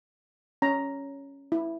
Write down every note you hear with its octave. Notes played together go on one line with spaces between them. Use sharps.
C#4 A#5
E4